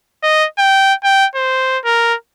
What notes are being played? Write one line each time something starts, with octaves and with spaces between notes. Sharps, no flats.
D#5
G5
G5
C5
A#4